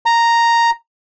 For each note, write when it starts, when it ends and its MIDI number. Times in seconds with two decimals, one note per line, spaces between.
0.06 0.70 82